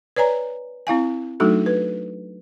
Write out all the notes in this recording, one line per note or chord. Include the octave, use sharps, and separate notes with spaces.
B4 C#5 D5 G#5 A#5
C4 E4 F5 G#5
F#3 A3 D4 D#4 F#4 A4
B4